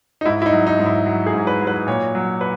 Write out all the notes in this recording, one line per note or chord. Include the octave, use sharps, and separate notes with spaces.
D#4
G#2 E4
E4
D#4
F#3
D#4
G#2
E4
F#3
G#4
G#2
B4
F#3
B4
A#2 C#5
F#3
B4